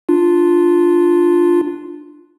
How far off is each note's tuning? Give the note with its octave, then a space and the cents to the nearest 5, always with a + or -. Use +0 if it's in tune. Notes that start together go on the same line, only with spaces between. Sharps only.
D4 +15 F4 +0